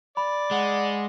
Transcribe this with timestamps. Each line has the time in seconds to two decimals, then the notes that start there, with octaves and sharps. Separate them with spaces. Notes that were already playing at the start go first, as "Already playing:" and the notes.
0.17 D5 B5
0.51 G#3 F#5